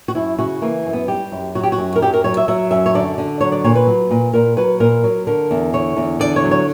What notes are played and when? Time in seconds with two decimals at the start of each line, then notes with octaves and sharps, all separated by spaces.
0.08 F#4
0.15 F#2 E4
0.39 C#3 F#4
0.62 E3 A#3
0.86 F#2
0.93 B3
1.08 G3 G4
1.32 F#2
1.55 F#3 F#4
1.63 G4
1.72 F#4
1.78 F#2
1.96 A#4
2.02 F#3 G4
2.14 A#4
2.24 F#3 C#5
2.37 E5
2.48 F#3 E5
2.71 F#2 E5
2.86 C#5
2.94 D3 D5
3.18 D3
3.41 F#3 C#5
3.52 D5
3.64 A#2 C#5
3.75 B4
3.87 F#3
4.11 A#2
4.33 A#2 A#4
4.57 F#3 B4
4.80 A#2 A#4
5.04 F#3
5.27 D3 A#4
5.51 E2
5.73 D3 C#5
5.97 E2
6.19 D3 D5
6.36 C#5
6.44 F#3
6.51 C#5